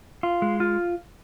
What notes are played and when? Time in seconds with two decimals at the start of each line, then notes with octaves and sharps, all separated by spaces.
0.23 F4
0.42 G#3
0.60 F4